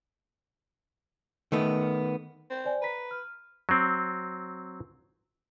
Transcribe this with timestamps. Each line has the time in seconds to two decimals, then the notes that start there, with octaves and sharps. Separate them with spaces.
1.52 D#3 A3 B3
2.50 C4
2.65 C5 D5 G#5
2.82 B4 A#5 B6
3.11 F6
3.69 F#3 C4